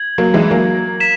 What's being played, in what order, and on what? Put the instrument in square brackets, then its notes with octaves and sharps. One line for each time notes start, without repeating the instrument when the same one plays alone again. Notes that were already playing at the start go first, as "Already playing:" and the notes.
Already playing: [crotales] G#6 F#7
[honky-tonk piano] F#3 A#3
E3 G#3
F#3 A#3
[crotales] B6 E7